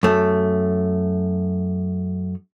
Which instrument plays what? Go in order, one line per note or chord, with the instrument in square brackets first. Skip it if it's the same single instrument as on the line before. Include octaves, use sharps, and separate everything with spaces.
[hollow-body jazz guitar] F#2 A3